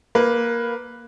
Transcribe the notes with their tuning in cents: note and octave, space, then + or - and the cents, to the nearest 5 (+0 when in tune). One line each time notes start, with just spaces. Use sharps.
A#3 +10 B4 +0